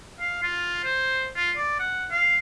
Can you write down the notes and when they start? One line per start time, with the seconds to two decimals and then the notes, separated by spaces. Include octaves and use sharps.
0.20 F5
0.43 F4
0.85 C5
1.36 F4
1.57 D5
1.80 F#5
2.11 F5